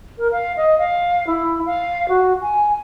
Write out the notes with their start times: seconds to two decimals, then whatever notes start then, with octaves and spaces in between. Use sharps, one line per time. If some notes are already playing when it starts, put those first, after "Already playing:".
0.18 A#4
0.32 F5
0.57 D#5
0.78 F5
1.27 E4
1.66 F5
2.09 F#4
2.41 G#5